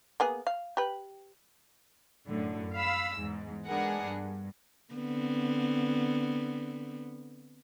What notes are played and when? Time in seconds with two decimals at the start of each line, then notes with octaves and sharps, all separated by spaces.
0.20 A#3 B3 G#4
0.47 F5
0.77 G4 B4
2.27 F#2 A2 D3
2.74 F5 B5 E6
3.17 E2 G#2
3.65 G#3 B3 D4 G#4 A#4 F#5
4.03 G2
4.93 D3 B3 C4